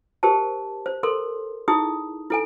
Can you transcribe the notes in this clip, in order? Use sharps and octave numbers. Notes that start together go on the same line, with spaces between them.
G4 A#4 C5 A5
C5
A4 A#4 C6
D#4 E4 G#4 D#6
E4 A4 G#5